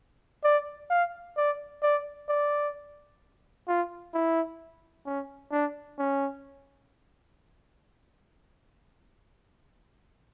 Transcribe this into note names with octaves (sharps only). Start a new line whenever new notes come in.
D5
F5
D5
D5
D5
F4
E4
C#4
D4
C#4